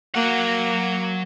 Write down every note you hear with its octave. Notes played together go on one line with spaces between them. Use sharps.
F#3 A#3 F#5